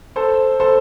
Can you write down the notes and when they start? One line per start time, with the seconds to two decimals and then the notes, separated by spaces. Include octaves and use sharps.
0.16 A4 C5
0.60 A4 C5